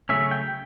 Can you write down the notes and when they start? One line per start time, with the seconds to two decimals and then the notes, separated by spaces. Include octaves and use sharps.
0.09 C#3 F#3 A3 C#4 E5
0.31 G5